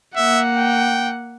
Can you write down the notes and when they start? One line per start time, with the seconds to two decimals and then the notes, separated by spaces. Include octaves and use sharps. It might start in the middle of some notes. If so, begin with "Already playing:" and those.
0.16 A#3 E5 F#5
0.56 G5